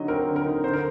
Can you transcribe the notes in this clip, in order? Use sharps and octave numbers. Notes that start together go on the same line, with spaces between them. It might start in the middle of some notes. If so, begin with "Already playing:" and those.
Already playing: D3 F#3 D#4 D#5
C4 A#4
D3
A#4
D#4
D3 C5
A#4